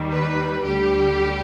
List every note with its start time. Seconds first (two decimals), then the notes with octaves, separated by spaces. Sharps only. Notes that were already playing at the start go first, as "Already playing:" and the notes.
Already playing: D#2 D#3 G3
0.11 B4
0.64 D2 D3 G3 G4